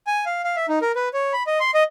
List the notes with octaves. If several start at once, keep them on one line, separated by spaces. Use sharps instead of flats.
G#5
F5
F5
E5
D#4
A#4
B4
C#5
B5
D#5
C6
D#5